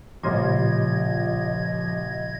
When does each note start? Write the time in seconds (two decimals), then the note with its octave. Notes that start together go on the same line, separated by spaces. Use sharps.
0.23 A1 A#2 C#3 F3 G3 D#5 C6 G#6